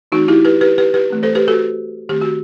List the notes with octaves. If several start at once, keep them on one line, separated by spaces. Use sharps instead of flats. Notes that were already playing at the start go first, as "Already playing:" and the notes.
E3 A3 C4 D#4 F#4
E4 G4
G4 B4
G4 B4
G4 B4
G4 B4
E3 A3 C4
A4 C5
G4 B4
F#4 A4
D#3 A3 C4 G4
F#4